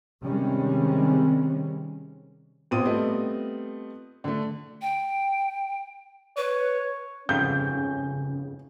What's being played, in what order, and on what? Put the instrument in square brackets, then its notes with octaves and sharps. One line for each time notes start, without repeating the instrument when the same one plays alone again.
[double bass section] C3 D#3 G3 G#3 C4 C#4
[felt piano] A#1 C3 B3 F4 D#6 D#7
G3 A3 B3 C4 F4 D#5
D3 A3
[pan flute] G5
[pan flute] B4 [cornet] C#5
[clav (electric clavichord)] G1 F2 G#2 [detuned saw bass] C#3 [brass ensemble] C#4 [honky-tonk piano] G6